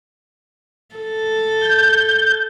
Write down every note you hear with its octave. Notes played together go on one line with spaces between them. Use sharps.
A4
G6